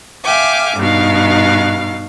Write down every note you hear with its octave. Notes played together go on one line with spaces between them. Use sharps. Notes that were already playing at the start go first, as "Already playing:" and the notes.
E5 F5 G5 G#5 D6
G2 B2 D#4 F5